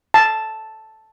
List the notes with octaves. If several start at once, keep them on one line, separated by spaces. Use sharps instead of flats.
A5